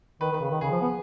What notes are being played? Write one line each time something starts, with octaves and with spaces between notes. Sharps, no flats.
D#3 B4
D#3
B4
C#3
D#3
C#3 G#4
F3
B3